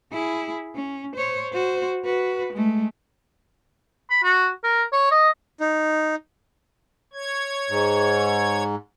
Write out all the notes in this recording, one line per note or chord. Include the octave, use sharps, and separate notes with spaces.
E4 G#4
C#4
C5 C#5
F#4 C5
F#4 B4
G#3 A3
B5
F#4
A#4
C#5
D#5
D#4
C#5 G#6
G#2